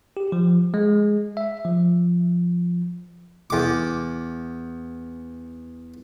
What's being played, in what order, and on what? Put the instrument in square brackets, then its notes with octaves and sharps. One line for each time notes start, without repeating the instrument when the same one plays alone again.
[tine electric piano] G4
F3
G#3
E5
F3
[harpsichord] E2 D6